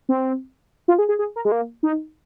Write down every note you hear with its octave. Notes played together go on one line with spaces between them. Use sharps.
C4
F4
G#4
G#4
G#4
A#4
G#3
A#3
D#4